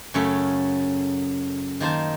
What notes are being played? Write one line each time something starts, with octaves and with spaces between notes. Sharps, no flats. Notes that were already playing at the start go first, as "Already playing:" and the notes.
F#2 C#3 A3 C#4 A4
D#3 A#3 C5 A5